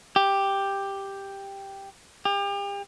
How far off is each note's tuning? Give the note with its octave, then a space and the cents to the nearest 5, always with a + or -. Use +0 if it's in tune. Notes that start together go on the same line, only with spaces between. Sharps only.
G4 +5
G4 +40